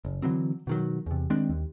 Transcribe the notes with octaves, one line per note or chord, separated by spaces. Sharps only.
F#1
D3 E3 F#3 C4
B2 D#3 F#3
E2 C3
D#3 G#3 C4 D4
D#2